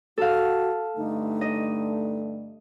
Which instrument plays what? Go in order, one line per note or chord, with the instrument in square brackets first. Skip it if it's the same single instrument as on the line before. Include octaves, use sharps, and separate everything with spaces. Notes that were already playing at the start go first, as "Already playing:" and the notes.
[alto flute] F#4 [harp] A4 F5
[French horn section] G2 D3 A3 [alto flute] D#4
[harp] D#5